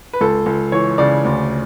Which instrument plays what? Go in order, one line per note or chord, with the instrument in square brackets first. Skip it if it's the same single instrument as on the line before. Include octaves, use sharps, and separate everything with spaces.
[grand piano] B4
C#2 A4
C#2
E3 C#5
C#3 D5
D2